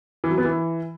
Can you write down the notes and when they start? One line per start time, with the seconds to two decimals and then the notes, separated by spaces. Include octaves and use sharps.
0.24 E3
0.31 F#3
0.38 B3
0.45 E3